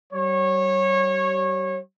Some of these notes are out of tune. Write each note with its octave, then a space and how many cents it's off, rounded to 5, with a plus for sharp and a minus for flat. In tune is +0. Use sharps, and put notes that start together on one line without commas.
G3 -40 C#5 -25